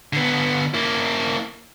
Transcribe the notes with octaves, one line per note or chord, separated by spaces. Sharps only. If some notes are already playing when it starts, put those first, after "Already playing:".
D3 B3
A#3 E4